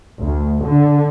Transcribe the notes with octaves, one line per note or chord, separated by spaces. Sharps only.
D2
D3